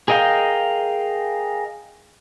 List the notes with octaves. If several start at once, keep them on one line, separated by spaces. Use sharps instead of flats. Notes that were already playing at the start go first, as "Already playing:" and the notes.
G#4 A#4 D#5 F5 G5